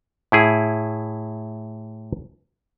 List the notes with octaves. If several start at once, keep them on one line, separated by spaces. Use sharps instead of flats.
A2 E4 G#4